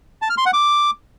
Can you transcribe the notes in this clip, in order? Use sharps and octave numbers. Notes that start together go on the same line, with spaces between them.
A5
F6
C6
F#5
D6